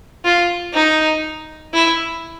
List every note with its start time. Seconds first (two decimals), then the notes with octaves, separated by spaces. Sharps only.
0.25 F4
0.74 D#4
1.74 E4